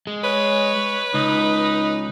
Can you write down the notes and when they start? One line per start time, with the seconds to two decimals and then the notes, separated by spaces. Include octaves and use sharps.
0.07 G#3
0.24 B4 C#5
1.14 C#2 D#4